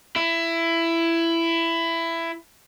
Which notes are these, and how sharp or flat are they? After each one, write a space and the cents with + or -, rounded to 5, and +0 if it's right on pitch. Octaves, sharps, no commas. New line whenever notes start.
E4 +15